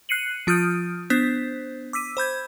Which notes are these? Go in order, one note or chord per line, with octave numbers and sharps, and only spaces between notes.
F#6 C7 C#7 D#7 F#7
F3 F4 D#6 F6 G6 D7
B3 D4 C5 G6 B6
D6 E6 B6 D#7
C5 B5 G6 G#6